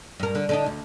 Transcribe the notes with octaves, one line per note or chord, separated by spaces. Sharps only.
G2 A#4
D3
D3 D4 D#4
D2